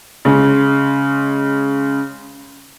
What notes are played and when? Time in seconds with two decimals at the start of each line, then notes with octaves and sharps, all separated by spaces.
0.25 C#3 G#3